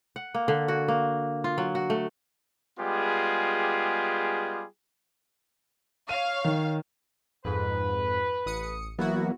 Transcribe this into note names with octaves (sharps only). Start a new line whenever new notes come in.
F#5
A#3
D3
F#4
A#3
F4
F#3
F#4
A3
G3 G#3 B3 F4 G4 G#4
C#5 F5 D#7
D#3
F2 G#2 B4
A1 D#6 C#7
E3 F#3 A#3 B3 E4 F#4